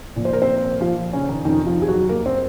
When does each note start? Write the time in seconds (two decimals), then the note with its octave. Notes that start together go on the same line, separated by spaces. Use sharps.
0.16 A#2 F3
0.25 C5
0.33 A#4
0.42 C4 C5
0.81 F3 F4
1.13 C#3 C#4
1.29 D#3 D#4
1.45 F2 C3 D#3 F3 D#4
1.66 F3 F4
1.82 G#4
1.88 F#3 F#4
2.09 A#3 A#4
2.26 C4 C5